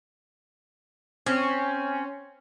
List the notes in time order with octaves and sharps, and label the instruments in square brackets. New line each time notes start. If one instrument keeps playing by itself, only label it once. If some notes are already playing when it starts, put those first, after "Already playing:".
[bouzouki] C4 [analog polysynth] C#4